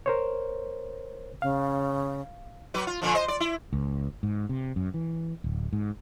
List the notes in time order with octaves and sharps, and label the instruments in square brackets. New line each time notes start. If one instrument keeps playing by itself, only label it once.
[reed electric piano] A#4 C5 C#5
[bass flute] C#3 [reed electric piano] F5
[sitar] F#3 B4
F4
A#2 D3 F3
C5 D#5
D5
E4
[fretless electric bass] C#2
G#2
C3
F#2
E3
D1
G#2